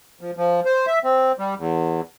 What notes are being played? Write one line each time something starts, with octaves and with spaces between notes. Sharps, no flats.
F3
F3
C5
E5
C4
G3
E2